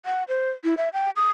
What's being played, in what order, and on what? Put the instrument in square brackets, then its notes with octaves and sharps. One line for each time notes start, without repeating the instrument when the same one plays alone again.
[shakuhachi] F#5
C5
E4
E5
G5
D#6